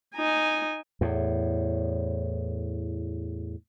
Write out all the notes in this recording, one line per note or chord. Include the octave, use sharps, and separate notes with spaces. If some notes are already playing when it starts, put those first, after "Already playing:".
D#4 G#5
E2 A2